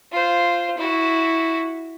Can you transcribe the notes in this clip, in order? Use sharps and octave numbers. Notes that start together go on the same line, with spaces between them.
F4 C5
E4 F#4